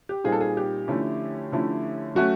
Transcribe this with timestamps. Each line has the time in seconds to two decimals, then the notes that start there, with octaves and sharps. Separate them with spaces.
0.09 G4
0.24 A#2 G3 C4 D#4 G#4
0.32 A4
0.41 G#4
0.57 G4
0.88 D3 F3 A3 C#4 E4
1.52 D3 F3 A3 C#4 E4
2.15 F#3 A3 C#4 F#4